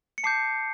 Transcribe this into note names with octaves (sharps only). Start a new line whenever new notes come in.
C#7
A5 D6 G6 C7